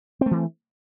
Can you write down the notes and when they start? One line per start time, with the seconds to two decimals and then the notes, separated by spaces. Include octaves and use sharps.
0.21 C4
0.26 A3
0.31 E3